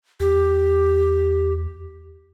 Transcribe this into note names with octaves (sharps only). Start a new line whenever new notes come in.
E2 G4